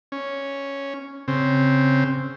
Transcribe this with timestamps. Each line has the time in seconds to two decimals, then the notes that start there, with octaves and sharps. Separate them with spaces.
0.12 C#4
1.28 C#3 C4